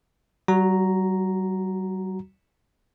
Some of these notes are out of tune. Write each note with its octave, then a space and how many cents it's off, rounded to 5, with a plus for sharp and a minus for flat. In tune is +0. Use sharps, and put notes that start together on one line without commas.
G3 -45 F#4 +0 A#5 +0